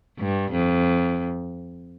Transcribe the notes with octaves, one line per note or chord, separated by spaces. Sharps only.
G2
F2